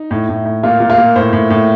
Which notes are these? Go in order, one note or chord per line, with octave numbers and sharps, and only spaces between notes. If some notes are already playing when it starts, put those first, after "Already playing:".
Already playing: D#4
A2
A2
A2
A#2 F4
A#2
F4
A#2
A2 C5
A2
A2